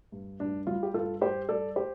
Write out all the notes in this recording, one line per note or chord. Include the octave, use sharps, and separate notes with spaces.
G2
G2 D4
G3 F4
G4
G2 F4 A4
G2 G4 C5
G2 A4 D5
G4 C5